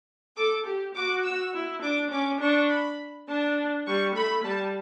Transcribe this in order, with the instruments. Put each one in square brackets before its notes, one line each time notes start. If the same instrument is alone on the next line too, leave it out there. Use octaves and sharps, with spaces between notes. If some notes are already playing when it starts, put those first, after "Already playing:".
[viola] A4 [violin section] D6
[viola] G4
[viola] F#4 [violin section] D6
[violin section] E6
[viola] E4
[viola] D4 [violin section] D6
[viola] C#4 [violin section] D6
[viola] D4 [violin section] C#6
[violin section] B5
[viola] D4 [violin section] A5
[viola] G3 [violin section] C#6
[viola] A3 [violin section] B5
[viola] G3 [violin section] A5